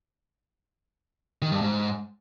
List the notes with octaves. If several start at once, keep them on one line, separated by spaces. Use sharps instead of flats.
D#3
G2
G#2